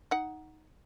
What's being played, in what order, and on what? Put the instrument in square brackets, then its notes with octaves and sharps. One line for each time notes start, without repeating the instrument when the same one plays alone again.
[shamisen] D#4 F#5